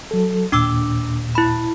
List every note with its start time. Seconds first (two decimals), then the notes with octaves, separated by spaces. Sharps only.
0.11 F#3 A4
0.52 D#2 A#2 D4 D6 E6
1.35 E4 B5